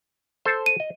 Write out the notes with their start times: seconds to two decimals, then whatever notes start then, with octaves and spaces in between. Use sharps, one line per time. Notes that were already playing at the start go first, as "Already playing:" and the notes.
0.45 A4 C5
0.66 D#7
0.80 D#5